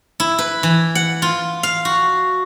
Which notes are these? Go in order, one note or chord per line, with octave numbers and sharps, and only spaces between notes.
E4
B4
E3
F#5
F4
F5
F#4